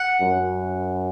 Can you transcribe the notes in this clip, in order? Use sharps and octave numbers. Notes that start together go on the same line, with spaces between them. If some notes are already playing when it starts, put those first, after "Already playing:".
Already playing: F#5
F#2